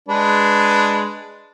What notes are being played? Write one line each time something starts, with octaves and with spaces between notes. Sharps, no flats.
G#3 D4 B4